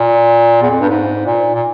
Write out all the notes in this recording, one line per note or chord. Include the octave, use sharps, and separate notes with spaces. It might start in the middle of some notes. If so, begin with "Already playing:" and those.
Already playing: A#2
E2
F2
G2
G#2
A#2
A#2